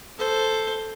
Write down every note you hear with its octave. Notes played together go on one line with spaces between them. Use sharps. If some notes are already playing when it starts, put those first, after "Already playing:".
A4 C5